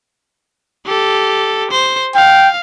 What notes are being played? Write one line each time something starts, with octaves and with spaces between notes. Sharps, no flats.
G4 A4
C5
F5 G5